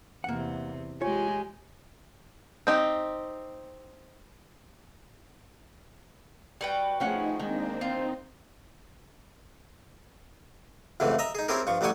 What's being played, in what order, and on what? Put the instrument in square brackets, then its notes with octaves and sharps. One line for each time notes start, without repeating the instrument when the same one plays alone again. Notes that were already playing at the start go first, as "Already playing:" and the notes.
[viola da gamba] E2 C3 [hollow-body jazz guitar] A#3 F#5
[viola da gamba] G#3 G4 [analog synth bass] F4 [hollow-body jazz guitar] C#5 [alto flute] G#5
[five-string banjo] C4 D#4 G4
[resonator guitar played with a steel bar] G3 [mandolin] F#4 B4 G5
[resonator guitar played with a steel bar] F3 C#4 F#5 [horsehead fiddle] A3 G#4 [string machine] D#4
[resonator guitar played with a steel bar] D#3 [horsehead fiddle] G#3 [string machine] A#3 C4 D4
[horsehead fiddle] C4 [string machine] D#4 [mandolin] F4
[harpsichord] C#2 F#2 C3 E3 A3
D#5 E5 A#5
D#4 G#4
C4 C#4 E4 G4 G#4 A#4
G2 F3 C#6
A1 F#3 G3 G4 G#5 C#6